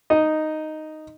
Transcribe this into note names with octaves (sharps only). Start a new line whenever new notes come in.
D#4 D#5